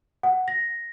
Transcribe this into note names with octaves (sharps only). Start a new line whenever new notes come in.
F#5
A#6